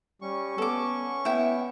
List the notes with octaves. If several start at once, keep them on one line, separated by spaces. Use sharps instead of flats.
G3 C#4 C#6
B3 A4 D6
B3 E4 G5